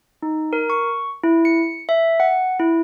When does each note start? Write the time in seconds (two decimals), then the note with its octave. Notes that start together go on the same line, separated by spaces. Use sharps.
0.23 D#4
0.53 A#4
0.70 C#6
1.24 E4
1.45 C#7
1.89 E5
2.20 F#5
2.59 E4